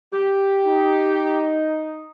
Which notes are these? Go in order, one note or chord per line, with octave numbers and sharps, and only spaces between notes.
G4
D#4